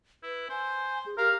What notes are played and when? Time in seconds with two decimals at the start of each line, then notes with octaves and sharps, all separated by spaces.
0.23 E4 B4
0.50 C5 G#5
1.06 G#4
1.18 G4 A#4 F5